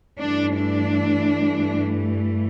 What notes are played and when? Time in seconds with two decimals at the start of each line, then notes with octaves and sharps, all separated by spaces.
0.20 G2 E3 A3 D4
0.56 D4